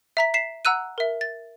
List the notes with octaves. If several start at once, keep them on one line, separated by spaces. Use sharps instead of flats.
E5 A#5 B6
B6 C7 E7
F#5 A#5 E6 F#6 D#7
A#4 E5
A6